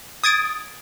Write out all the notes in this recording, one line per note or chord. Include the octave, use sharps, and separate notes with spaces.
D#6 G#6 A6 D7